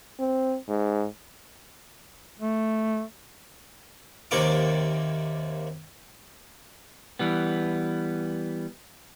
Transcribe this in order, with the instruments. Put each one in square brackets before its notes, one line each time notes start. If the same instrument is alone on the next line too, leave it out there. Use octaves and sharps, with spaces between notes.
[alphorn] C4
G#2
[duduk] A3
[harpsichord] D#2 C3 A#3 D5 C#6 D6
[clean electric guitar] E3 G3 B3